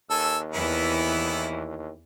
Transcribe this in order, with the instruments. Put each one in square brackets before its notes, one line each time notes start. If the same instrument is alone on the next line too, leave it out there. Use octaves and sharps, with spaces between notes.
[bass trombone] D#2 [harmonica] A4 G#5 E6
[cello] E2 E3 [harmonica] B3 E4